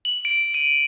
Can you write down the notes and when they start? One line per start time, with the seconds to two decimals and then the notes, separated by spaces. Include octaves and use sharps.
0.05 F#7
0.25 D7
0.54 D#7